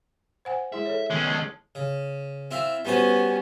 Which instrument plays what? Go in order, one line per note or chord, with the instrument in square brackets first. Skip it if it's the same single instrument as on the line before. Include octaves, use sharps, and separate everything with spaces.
[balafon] C5 F#5 G#5
[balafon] G#3 E4 G#4 [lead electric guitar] E5
[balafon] A4 C#5
[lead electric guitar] D#3 B3 [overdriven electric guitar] G#3 C#4
[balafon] A5
[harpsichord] C#3
C4 E4 F4
[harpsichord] G3 F#4 C5 [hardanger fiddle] B3 C#4